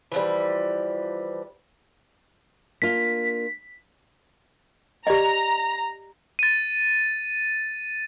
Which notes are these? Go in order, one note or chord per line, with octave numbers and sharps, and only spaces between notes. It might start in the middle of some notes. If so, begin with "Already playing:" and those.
E3 F3 G3
A#3 D4 F4 B6
G4 D5 D#5 A#5
A6 D#7